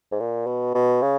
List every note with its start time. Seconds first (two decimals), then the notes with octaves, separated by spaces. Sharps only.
0.11 G#2
0.20 A#2
0.46 B2
0.74 B2
1.02 C#3